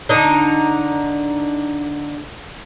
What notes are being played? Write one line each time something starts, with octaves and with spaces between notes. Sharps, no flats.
D3 D#4